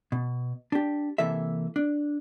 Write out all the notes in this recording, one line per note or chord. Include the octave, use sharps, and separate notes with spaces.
B2
D4 G4
C3 E3 A#3 A4 E5
D4